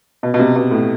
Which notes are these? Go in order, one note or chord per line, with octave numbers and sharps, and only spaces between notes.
B2
B2
C3
B2
A2